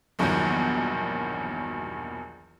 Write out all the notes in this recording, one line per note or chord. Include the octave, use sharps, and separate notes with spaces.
A#1 E2 G2 B2 D#3 F#3